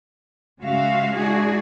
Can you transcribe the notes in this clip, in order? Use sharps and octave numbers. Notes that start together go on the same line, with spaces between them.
C#3 G#3 F#4 E5 F5
G#3 D4 E4 F#4 G#4